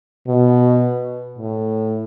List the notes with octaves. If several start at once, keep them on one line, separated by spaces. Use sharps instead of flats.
B2
A2